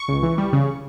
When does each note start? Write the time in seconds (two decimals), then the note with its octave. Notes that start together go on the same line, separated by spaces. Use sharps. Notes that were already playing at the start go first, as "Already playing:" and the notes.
Already playing: C#6
0.08 C#2
0.23 E3
0.38 G3
0.53 C#3